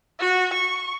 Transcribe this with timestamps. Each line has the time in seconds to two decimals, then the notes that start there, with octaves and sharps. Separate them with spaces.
0.20 F#4
0.53 C#6